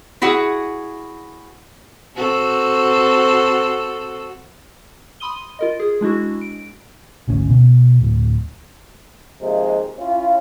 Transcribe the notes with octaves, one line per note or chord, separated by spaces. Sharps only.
E4 F#4 G#4 F#5
C4 F#4 A4
B5 C6 D#6 D#7 G7
F4 A#4 D#5
G#4
G#3 D4 E4 F#4
D7
G#1 D2 C#4
B2
D1
C3 D#3 F3 G#3 A#3
C#4 E4 F4